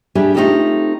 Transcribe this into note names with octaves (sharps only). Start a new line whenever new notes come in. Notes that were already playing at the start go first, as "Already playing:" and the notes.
G3 D4 G4 G#4 E5 G#5
A3 C4 D#4 F4 G4 A4